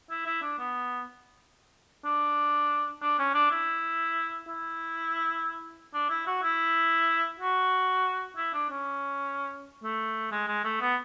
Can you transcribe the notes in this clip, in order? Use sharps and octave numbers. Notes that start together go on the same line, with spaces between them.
E4
E4
D4
B3
D4
D4
C#4
D4
E4
E4
D4
E4
F#4
E4
F#4
E4
D4
C#4
A3
G#3
G#3
A3
B3